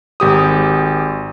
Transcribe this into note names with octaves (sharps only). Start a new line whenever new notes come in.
G#1 G4 D#6